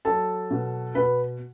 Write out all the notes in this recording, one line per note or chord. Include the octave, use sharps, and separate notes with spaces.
F#3 A4 A5
B2
B2 B4 B5